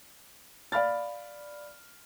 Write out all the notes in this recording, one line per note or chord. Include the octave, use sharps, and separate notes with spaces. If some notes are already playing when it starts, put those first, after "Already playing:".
D5 F5 B5 F6 A6